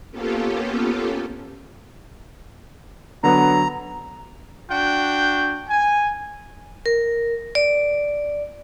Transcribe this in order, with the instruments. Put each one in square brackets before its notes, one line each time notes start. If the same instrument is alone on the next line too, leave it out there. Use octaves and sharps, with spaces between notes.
[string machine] A#3 B3 C#4 F4 G4 A4
[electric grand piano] D3 F#3 [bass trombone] B3 [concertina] A#5
[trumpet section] D4 F#4 G5
G#5
[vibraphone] A#4
D5